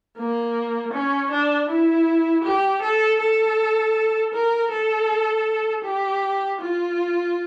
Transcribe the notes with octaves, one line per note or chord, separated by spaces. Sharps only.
A#3
C#4
D4
E4
G4
A4
A4
A#4
A4
G4
F4